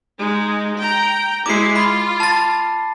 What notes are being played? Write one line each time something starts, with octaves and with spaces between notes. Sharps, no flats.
G#3 D#4
G5 A#5
G#3 E4 D6 C7
F4 B5
A5 A6